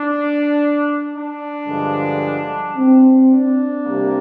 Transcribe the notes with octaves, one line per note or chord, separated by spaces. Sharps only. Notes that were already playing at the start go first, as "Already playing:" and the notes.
Already playing: D4
D4
G2 D3 F3 G#3
C4
D4
C2 C3 G3 A#3